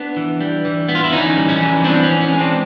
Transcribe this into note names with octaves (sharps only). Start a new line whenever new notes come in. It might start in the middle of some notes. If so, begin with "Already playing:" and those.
Already playing: B3 D4
E3
G3
E3
B3
F4
E4
E3 C#4 D#4
G3
C#4
E3
B3 C4 D4
C#4
E3
C#4
G#3
C4 D4